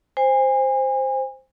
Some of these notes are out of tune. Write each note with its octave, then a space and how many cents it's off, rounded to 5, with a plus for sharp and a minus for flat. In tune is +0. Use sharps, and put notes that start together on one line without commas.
C5 +0 G#5 -35